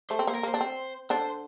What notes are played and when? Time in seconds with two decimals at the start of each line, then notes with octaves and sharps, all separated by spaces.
0.10 A3 C5
0.19 C4
0.27 A#3 C5
0.35 A#4
0.43 A#3 C5
0.54 D4
0.61 C4
1.10 D3 D4 C5